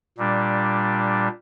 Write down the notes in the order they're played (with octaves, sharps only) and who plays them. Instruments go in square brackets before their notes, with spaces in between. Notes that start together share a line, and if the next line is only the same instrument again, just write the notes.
[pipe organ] A#2 G3 D4